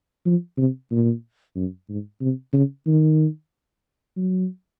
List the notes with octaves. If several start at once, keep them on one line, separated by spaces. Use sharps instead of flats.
F3
C3
A#2
F#2
G#2
C3
C#3
D#3
F#3